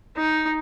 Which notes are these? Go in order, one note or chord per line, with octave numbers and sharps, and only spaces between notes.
D#4